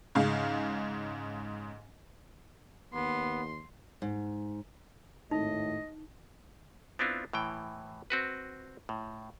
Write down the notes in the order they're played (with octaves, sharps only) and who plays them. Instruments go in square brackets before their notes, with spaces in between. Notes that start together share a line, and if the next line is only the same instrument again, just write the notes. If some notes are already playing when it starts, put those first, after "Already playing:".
[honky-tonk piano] G#2 C#3 F5
[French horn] D#2 [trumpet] B3 [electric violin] C6
[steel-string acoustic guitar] G#2
[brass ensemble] G#1 A2 [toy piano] D#4 [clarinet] D#5
[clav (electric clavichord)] B3 C4 D4 E4 F4
A2 E3 G5
C4 F#4 B4
A2